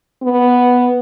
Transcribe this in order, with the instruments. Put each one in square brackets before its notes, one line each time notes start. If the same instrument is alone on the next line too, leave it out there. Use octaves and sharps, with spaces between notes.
[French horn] B3